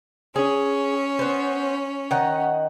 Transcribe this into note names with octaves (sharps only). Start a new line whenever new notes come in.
C#4 G#4
B3 C5
D#3 D#5 F#5